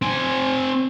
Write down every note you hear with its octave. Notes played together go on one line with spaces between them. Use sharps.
C4 G#5